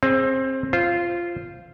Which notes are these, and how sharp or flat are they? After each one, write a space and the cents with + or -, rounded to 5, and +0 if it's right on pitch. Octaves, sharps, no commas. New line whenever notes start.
C4 +20 G#4 +0 C5 +45
F4 -10 C5 +0